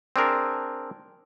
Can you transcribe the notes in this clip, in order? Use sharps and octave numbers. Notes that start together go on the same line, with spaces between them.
C4 D4 G#4 A#4 A5